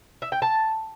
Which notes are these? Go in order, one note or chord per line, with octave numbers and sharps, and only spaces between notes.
E5
G5
A5